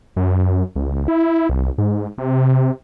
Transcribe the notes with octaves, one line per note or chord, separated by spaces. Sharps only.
F#2
C#2
E4
C2
G#2
C3